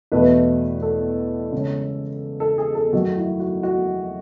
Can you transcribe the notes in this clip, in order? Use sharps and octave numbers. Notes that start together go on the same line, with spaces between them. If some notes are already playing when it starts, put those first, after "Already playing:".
E2 B2 A3 B4
A4
C#3 G#3 C#4
A4
G#4
A4
F#2 D#3 A3 F#4
E4
F#4
F#4